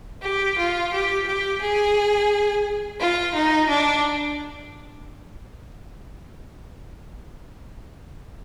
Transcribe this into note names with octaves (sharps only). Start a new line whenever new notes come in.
G4
F4
G4
G4
G#4
F4
D#4
D4